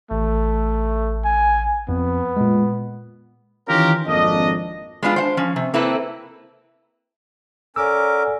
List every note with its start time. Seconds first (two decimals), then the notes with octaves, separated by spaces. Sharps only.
0.11 A1 A3
1.24 G#5
1.89 F2 B3
2.37 A#2 G#3
3.68 D#3 E3 C#4 F4 G4 A#4
4.07 G#1 F2 A#3 D4 D#5
5.03 G#3 B3 D4 F4
5.16 C5 F#5 A5
5.37 F3 C#4
5.56 C3
5.74 A#3 C4 E4 A4 B4
7.76 C#4 A4 A#4 D5 F#5 D6 E6